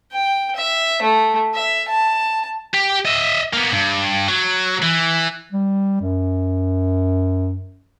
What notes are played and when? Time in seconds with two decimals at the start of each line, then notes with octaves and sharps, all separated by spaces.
0.12 G5
0.56 E5
1.02 A3
1.54 E5
1.88 A5
2.74 G4
3.06 D#5 E5
3.53 A#3 B3
3.72 G2
4.28 F#3
4.82 E3
5.52 G3
6.01 F#2